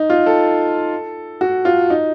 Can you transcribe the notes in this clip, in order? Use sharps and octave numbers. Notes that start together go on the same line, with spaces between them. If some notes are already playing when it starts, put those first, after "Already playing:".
Already playing: D#4
F4
A4
F#4
F4
D#4